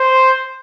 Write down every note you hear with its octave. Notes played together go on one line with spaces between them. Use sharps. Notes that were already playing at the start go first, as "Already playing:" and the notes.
Already playing: C5